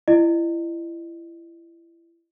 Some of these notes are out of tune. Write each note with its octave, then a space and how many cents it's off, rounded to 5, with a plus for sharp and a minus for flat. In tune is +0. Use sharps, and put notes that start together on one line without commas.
E4 +30 D#5 -35